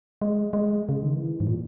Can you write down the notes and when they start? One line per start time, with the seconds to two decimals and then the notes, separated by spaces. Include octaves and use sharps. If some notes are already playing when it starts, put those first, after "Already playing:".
0.21 G#3
0.53 G#3
0.89 C#3
1.03 D#3
1.16 E3
1.40 G#2
1.47 A#2